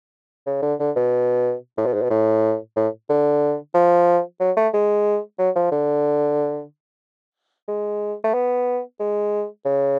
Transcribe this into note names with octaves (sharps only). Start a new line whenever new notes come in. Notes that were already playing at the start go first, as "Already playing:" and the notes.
C#3
D3
D3
B2
A2
B2
G#2
B2
A2
A2
D3
F3
F#3
A3
G#3
F#3
F3
D3
G#3
A3
B3
G#3
C#3